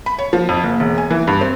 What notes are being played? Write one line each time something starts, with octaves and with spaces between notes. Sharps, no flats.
B5
C#5
F3
F2
F#1
E1
G#5
E3
G2
C4